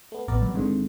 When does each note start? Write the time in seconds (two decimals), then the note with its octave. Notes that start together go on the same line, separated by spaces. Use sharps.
0.12 A3 B3
0.28 A1 B3 A#4 D5
0.42 F#3 G3
0.55 G#1 G#2 D3 G#3 C4